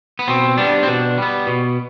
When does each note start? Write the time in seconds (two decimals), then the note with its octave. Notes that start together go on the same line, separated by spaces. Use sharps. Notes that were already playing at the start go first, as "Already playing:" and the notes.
0.19 B3
0.28 B2 C4
0.58 G3 B3 D4
0.83 C4
0.87 B2 D4
1.18 G3 B3
1.47 B2